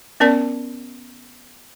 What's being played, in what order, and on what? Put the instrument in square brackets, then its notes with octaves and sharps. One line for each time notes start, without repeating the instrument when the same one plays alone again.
[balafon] B3 C#4 A#4 D5 A5